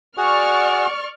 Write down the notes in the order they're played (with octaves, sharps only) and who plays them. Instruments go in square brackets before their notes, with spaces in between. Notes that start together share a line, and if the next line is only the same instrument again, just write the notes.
[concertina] F#4 G#4 F#5 [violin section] D5 C#6 F6